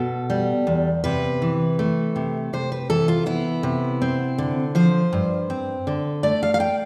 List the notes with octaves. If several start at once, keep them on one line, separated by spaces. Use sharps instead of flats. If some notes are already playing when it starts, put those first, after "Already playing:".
Already playing: B2 A4
G3
E2
C3 B4
E3
A3
C3
C3 C5
B4
E3 A4
F4
B3 E4
C3
C4
D3
F3 C5
G2
C4
D3
A3 D5
F5
F5
G5